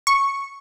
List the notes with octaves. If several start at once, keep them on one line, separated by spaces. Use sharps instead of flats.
C#6